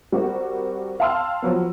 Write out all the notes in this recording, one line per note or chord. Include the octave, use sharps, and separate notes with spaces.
G3 C4 F#4 A#4
F5 G5 A5 C6 E6 F6
F3 F#3 B3